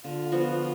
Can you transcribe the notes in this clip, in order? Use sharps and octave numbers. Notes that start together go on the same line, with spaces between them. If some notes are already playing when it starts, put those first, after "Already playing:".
D3 F4
F3 B3 F#4